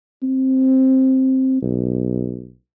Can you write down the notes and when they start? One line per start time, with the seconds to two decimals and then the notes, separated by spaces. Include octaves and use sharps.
0.23 C4
1.62 B1